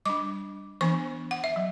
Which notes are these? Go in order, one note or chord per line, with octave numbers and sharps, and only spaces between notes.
G3 D4 D6
E3 B3 D4 C#6
F#5
E5
F#3